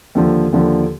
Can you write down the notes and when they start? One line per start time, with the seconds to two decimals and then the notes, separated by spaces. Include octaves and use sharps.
0.15 D#2 D3 F3
0.53 D#2 D3 F3